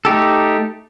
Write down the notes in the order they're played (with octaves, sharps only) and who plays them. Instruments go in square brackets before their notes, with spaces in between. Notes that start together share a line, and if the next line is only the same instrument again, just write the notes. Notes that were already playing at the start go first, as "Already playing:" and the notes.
[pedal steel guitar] A3 D#4 G4 A4